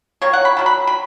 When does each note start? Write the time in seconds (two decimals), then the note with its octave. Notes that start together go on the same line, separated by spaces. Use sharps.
0.22 D#3 A#3 C#5
0.33 F#5
0.45 B5
0.57 D#3 F#3 A#3
0.66 B5
0.87 B5